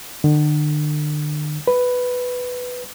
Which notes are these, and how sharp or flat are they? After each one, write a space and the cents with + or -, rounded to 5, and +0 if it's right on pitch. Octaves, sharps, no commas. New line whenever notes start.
D3 +40
B4 +5